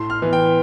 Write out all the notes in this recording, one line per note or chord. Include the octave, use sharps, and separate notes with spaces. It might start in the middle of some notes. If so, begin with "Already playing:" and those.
Already playing: A2 C6
F6
E3 B3
G5